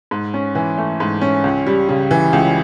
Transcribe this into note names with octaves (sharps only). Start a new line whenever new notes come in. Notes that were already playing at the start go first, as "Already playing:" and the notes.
G#2
C#4
E3
A3
G#2
C#4
C#2
G3
C#3
E3
C#2